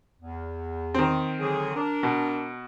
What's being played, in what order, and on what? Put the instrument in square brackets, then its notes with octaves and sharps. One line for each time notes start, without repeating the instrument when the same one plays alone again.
[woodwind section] E2
[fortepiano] D#3 C4
[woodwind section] D3 F#3 G#4
D4 A#4
[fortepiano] B2